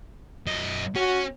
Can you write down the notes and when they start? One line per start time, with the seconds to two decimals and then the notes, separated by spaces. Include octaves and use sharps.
0.46 F#2 D#5
0.96 C#4 F#4